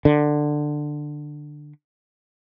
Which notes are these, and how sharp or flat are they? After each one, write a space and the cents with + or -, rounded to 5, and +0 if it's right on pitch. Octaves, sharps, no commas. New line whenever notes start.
D3 +15